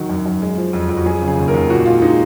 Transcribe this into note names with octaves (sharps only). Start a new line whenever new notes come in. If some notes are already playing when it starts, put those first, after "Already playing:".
Already playing: D#3 F#3 F#4
F#2
F#2
G#3
F3
F2
F2
F#4
F#3 G#4
C#3
G#4
D#2
A#4
D#2
A#2 F#4
G#3 F4
G#3 D#4